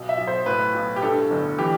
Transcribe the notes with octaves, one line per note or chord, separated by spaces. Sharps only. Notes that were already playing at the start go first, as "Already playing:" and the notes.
Already playing: B1 B2
E5
B1
C5
A2 B4
B1
G4
G2 A4
G1
E3 G4